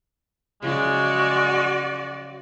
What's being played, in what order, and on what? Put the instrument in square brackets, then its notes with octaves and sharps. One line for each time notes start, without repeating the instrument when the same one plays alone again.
[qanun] C#3 F3 F#3 [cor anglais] G#3 [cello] F#4 D5